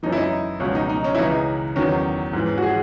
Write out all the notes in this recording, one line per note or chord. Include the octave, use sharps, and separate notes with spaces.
F#2 E3 D#4
E4
D#4
C#2 B2 F#3 C#4
D#4
D#4
C#4
E4
C#2 C#3 E3 D#4
E2 D#3 F#3 C#4
G#2 E3
F#4
G#4